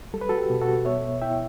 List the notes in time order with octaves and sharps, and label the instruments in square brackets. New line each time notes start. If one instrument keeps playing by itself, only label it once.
[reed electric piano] G3 A4
B4
F#4 A4
G4
B2
F#4 A4
B3 C#5 E5
E4 E5 G5